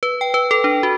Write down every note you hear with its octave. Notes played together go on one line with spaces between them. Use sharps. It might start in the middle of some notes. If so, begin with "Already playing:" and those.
B4
G5
B4
A4
D4
F#4